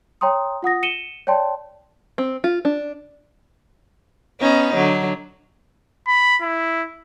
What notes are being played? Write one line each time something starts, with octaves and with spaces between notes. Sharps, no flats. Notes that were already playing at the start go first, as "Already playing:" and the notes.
C#5 G5 A#5 C6 D#6
F4 F#5 D#6 A#6
C#7 D#7 E7 G7
C#5 D5 G5 A5 C6
C4
F4
D4
B3 C#4 D#4
D3 F#3
B5
E4